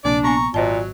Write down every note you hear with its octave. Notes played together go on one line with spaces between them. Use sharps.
A#1 C3 A#3 D4 D5
B3 G#5 A#5 C#6
G#1 A#2 F#3 C5 D#5 A5